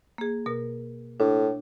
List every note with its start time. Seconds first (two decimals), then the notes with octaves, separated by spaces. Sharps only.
0.18 A#3 G#4
0.46 B2 A#4
1.20 A2 D4